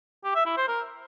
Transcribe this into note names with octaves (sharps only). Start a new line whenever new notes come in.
G4
E5
E4
C5
A#4